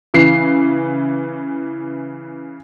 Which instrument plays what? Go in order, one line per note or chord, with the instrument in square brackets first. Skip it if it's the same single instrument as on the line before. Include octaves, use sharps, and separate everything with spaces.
[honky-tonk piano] C#3 E3 C7